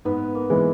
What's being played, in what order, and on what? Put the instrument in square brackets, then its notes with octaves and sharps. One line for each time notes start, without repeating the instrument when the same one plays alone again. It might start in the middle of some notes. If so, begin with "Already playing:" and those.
[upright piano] G#2 [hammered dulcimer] B3
[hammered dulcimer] A#3
[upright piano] E3 G#3 B3